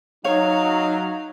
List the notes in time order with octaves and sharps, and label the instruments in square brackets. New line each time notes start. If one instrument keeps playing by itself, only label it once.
[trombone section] F#3 [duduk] D#4 [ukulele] C#5 [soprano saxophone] F5